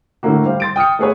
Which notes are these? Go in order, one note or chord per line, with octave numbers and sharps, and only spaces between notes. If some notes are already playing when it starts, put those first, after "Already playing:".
A2 D3 A3 A#3 F#4
G3 C5 F5
C6 A6 D7
G5 D#6 F6 C#7
A3 B3 G#4 B4 C#5